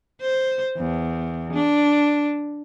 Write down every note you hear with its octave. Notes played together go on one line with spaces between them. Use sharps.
C5
E2
D4